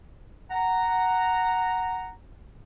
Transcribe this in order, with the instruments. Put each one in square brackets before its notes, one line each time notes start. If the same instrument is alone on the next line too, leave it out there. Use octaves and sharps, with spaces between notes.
[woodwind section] F#5 A#5